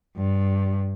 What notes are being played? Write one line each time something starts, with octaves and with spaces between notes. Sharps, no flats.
G2